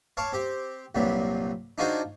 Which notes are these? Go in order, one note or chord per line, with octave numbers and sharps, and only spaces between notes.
C#5 F5 A5 D6
C4 G4
C2 G2 A#2 F#3 G3
D4 D#4 F4 F#4 G#4 C5